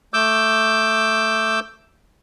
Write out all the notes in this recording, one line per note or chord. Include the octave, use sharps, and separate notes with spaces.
A3 D6 E6 G6